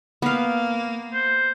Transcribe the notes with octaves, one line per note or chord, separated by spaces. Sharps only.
A#3 B3 F5
C5